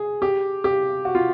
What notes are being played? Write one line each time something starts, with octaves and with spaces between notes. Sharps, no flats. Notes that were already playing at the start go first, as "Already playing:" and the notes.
Already playing: G#4
G4
G4
F#4
F4